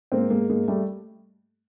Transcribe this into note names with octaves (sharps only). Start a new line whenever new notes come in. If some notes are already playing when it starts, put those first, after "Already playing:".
G#2 A#3 C4
G#2 G#3 A#3
G#2 G#3 A#3
G3 A3